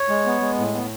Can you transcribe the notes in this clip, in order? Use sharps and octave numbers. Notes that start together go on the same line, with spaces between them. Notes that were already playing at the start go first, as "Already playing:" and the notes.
Already playing: C#5
G#3
B3
G#3
A2
B3